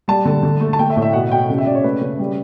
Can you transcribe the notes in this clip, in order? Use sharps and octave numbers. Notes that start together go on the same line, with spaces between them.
G3 A5
D3
D3
A3
A5
A3 G5
E5
A2
E5
B2 F#5
B2 G5
C#3
E5
C#3 D5
C#5
A3 B4
C#3
G3